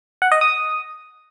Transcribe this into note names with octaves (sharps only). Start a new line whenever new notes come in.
F#5
D#5
D#6